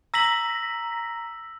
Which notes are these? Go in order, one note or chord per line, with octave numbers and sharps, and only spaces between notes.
A#5 E6 A#6 B6 F#7